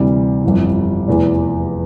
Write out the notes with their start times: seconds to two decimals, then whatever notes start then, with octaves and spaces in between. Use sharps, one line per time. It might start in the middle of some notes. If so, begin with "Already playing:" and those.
Already playing: D2 C3 E3 G3
0.44 G1 F2 E3
1.08 F1 E2 E3